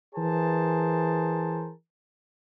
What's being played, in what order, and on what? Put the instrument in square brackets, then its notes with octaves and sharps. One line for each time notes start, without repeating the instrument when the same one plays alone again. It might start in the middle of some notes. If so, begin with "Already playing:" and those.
[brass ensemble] E3 G#4 A#4 C5 A5